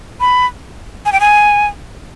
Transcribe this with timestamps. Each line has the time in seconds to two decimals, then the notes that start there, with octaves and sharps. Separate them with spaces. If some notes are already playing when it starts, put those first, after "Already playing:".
0.20 B5
1.06 G#5
1.12 G5
1.21 G#5